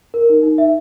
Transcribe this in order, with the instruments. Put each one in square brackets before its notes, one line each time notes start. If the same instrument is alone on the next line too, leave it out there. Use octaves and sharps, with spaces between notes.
[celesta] A#4
D#4
D#4
E5